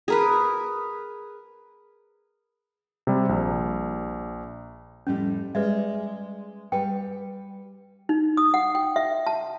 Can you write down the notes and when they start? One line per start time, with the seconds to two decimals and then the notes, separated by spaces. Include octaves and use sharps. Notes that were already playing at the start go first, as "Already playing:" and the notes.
0.08 G#4 A#4 B4
3.07 C3 G3
3.29 A#1
5.07 F2 A2 G3 C#4
5.55 G3 G#3 B4 D5 E5
6.72 G3 B4 G5
8.09 D#4
8.37 D#6
8.54 F#5
8.75 G5
8.96 E5
9.27 A5